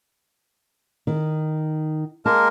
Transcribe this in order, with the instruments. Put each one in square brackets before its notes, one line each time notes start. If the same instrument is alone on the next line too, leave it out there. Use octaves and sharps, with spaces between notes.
[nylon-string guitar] D#3
[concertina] G#3 A#3 A#4 [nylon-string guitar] A5